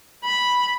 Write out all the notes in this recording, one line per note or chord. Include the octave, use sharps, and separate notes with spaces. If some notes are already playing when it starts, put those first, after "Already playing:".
B5